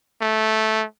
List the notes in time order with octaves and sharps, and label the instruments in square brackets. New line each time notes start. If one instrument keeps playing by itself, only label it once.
[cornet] A3